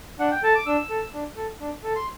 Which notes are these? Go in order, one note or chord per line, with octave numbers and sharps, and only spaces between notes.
D4 F#5
G5
A4 A5
D6
D4 E6
A4
D4
A4
D4
A4
C6